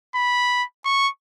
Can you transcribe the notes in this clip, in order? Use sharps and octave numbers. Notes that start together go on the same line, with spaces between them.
B5
C#6